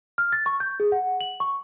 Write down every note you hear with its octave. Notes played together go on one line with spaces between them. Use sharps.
F6
A6
C#6
G6
G#4
F#5
F#7
C#6